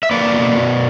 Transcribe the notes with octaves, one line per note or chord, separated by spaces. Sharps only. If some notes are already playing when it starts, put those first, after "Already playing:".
E5
A#3 B4 D5
B2
B2